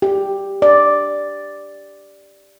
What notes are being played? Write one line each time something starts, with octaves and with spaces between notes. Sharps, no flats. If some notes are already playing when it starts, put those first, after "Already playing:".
G4
D5